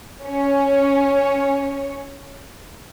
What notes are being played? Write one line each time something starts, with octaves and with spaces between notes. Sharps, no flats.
C#4 C#5